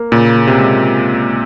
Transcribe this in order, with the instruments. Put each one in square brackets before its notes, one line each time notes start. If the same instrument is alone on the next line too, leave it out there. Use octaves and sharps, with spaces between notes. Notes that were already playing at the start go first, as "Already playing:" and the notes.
Already playing: [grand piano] A#3
[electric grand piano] A#2 [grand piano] C#3
[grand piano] C#3
[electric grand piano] C3
[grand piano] G#3